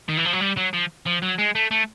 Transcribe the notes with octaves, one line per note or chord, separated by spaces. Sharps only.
D#3
E3
F3
F#3
G3
F#3
F3
F3
F#3
G#3
A3
A3